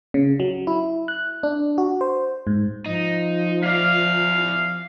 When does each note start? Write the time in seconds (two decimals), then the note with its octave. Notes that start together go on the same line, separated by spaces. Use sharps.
0.14 C#3
0.40 F#3
0.67 E4
1.08 F#6
1.43 D4
1.78 F#4
2.01 C5
2.47 G#2
2.86 F3 D#4
3.64 E4 D5 F5